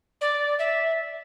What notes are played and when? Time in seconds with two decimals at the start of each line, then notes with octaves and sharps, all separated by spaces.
0.21 D5
0.59 E5